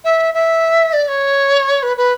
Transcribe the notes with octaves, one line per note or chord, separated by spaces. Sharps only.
E5
E5
D5
C#5
B4
B4